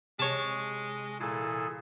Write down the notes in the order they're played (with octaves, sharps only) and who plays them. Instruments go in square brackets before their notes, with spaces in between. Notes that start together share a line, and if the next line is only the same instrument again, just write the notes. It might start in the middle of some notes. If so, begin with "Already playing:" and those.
[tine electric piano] C3 [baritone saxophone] G#3 [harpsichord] C#5 A5
[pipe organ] A#2 G#4 A4 [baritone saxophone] E3